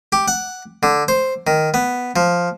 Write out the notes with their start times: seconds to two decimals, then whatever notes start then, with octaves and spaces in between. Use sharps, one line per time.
0.12 G4
0.28 F#5
0.83 D3
1.08 C5
1.47 D#3
1.74 B3
2.16 F3